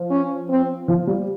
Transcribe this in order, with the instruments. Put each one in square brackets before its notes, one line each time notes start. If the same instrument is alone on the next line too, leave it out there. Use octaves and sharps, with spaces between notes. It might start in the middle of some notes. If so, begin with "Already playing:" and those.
Already playing: [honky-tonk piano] F3
[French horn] C#4
C4
[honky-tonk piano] F3
G3